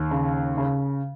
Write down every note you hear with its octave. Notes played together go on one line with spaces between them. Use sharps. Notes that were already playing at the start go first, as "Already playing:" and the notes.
Already playing: D#2
C#3
C#3